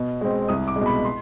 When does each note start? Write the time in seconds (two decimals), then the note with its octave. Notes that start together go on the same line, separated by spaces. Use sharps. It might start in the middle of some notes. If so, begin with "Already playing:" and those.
Already playing: B2
0.21 G#3 C4
0.49 C2 D#6
0.68 D6
0.76 G#3
0.81 B2 B5
1.05 C6